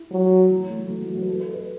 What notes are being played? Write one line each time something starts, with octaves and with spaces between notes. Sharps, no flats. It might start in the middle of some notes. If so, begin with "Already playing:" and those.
Already playing: E4
F#3
E3
F#3
A3
F#3
E3
F#3
F#3
B4
A4
B4
B4